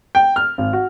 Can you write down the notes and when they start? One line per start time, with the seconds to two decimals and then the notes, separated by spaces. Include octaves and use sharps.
0.15 G5
0.36 F6
0.58 G#1
0.73 F#4